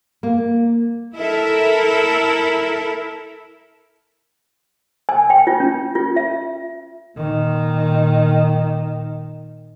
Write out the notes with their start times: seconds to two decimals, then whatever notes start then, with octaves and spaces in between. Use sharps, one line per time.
0.23 A#3
1.15 E4 A4 A#4 E5
5.09 G#5
5.30 G5
5.47 F4
5.60 C#4
5.95 F4
6.16 E5
7.17 A#2 D#3